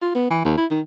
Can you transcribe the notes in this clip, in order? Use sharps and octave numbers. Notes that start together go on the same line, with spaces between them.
F4
B3
E3
D#2
E4
D#3